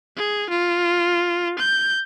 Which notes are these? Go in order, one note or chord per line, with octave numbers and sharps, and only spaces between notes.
G#4
F4
G6